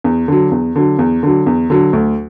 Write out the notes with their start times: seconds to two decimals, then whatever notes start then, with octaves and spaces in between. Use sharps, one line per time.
0.04 E2
0.28 D3 F#3
0.51 E2
0.76 D3 F#3
0.99 E2
1.23 D3 F#3
1.46 E2
1.70 D3 F#3
1.93 D2